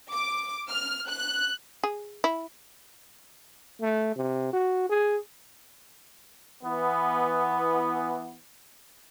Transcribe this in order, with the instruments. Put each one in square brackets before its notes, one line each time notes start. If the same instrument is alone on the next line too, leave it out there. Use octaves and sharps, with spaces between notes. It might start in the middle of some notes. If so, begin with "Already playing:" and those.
[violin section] D6
F6
F#6
[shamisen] G#4
E4
[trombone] A3
C3
F#4
G#4
[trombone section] E3 B3